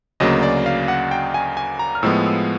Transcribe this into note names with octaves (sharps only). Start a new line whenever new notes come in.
D2 C#3 F#3 A#3 D#5
D5
F5
F#5
G5
G#5
G#5
A#5
F6
A2 F3 G#3 B3 E6
E6